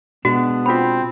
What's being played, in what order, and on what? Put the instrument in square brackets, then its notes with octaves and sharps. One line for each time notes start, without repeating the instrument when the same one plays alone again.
[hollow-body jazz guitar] B2 G#3 D4 [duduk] B3 [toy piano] F#4
[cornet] C4 [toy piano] F4 B5